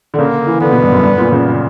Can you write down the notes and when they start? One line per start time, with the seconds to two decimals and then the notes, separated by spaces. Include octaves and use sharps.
0.14 D3
0.18 C#3 A#3
0.47 E3
0.61 D3 B3
0.72 B2
0.82 G2
0.92 F#2
1.03 G2
1.18 A#2
1.32 C#3